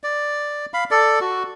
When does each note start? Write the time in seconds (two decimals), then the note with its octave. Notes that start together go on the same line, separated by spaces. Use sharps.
0.04 D5
0.74 F5 B5
0.91 A4 D5
1.21 F#4